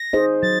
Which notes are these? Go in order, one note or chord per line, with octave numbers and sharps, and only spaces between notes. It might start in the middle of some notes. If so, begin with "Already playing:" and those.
Already playing: A#6
D#4 G#4 C5 D#5
F#3 A6